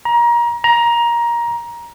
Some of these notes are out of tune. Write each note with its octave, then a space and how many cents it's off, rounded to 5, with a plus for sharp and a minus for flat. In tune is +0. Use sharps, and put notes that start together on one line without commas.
A#5 +25
A#5 +15